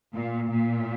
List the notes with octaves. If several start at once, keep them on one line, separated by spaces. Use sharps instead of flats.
A#2
A#2